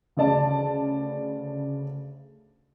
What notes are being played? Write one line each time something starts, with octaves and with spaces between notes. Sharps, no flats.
D2 C#3 D5 A5